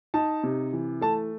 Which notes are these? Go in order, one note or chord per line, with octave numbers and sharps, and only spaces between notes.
D#4 A5
C3
E3
A3 A5